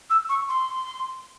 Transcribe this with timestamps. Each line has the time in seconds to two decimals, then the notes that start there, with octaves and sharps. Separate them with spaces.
0.10 E6
0.29 C#6
0.49 C6